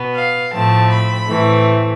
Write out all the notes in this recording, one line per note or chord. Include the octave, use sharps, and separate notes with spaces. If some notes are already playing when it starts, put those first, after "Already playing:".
Already playing: B2 B3
F5
A2 F3 A3 C4 A5
B5
A2 E3 A3 C4